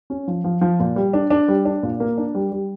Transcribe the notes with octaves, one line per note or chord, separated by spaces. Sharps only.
C#4
F3
F3
F3
A#2
G3
D4
D4
G3
D4
A#2
A#3
D4
G3
G3